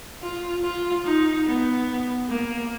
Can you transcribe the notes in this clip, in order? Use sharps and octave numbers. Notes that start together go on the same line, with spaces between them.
F4
F4
D#4
B3
A#3